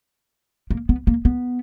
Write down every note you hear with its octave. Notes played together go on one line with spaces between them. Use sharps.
A#3
B3
A#3
B3